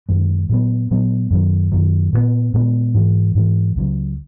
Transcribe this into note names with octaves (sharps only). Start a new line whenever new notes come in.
F#2 D#3 G#3
A#2 F#3 B3
A#2 F#3 B3
F#2 D#3 F#3
F#2 D#3 F#3
A#2 G#3 B3
A#2 G#3 B3
G#2 E3 G#3
G#2 E3 G#3
C#2 C#3 F#3